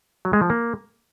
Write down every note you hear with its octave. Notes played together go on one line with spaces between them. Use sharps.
F#3
G#3
F3
A#3